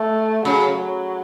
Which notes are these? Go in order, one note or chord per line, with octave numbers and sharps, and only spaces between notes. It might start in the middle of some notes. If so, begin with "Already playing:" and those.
Already playing: A3
C#3 F#3
F#3